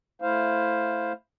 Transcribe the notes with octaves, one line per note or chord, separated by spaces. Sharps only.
A3 E4 C5 F5